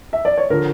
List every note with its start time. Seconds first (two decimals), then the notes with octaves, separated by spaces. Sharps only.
0.13 E5
0.25 D5
0.38 C#5
0.50 D3 F3 A#4